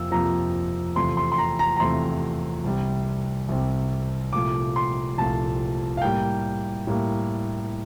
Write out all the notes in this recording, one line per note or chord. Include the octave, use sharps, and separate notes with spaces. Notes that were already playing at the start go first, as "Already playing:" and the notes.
Already playing: F2 C3 F3 A#3 E6
F2 C3 F3 A#3 A#5
E2 C3 F3 A3 C6
C6
C6
A#5
A#5
A#5
E2 C3 F3 A3 C6
C2 C3 G3
C2 C3 G3
C2 A#2 F3 A3 D6
C6
C2 A#2 F3 A3 A5
F5
A2 G3 A#3 G5
A2 G3 A#3